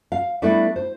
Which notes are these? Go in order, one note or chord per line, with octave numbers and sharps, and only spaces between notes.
F5
G3 A3 B3 D4 E4
C5